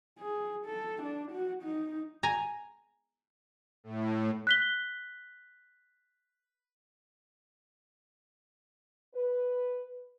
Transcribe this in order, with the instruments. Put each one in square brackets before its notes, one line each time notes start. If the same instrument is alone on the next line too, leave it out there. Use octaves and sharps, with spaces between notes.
[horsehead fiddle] G#4
A4
D4
F#4
D#4
[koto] G#5 A#5
[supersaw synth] A2
[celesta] F#6 B6 G7
[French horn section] B4